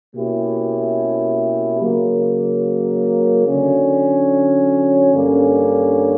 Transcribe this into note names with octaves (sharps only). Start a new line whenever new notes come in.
B2 A#3 C#4 E4 G4
C#3 F#3 A#3
D3 F#3 C#4
G2 D3 A#3 C#4